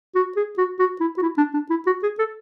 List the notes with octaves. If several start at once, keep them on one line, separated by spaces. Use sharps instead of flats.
F#4
G#4
F#4
F#4
E4
F#4
E4
D4
D4
E4
F#4
G#4
A4